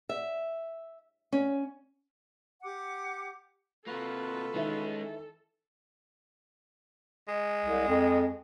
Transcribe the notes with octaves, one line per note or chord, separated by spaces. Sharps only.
E5
C#4
G4 F#5 D6
C3 A#3 F4 F#4 A4 B4
D#3 E3 G#3 C#4 E4
G#3
C2
F2